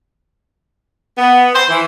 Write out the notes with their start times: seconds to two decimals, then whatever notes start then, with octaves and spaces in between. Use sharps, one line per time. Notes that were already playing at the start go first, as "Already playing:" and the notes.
1.17 B3
1.54 C5
1.69 E3